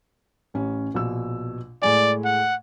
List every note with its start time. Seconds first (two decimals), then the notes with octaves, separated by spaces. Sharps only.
0.54 A1 C#4
0.94 A#1 B2 E6
1.82 A2 G#3 D5 G#5
2.25 F#5